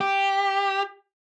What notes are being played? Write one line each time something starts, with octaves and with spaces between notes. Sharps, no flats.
G4